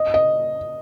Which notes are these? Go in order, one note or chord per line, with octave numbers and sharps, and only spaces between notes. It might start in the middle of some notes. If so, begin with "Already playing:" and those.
Already playing: D#5
D#5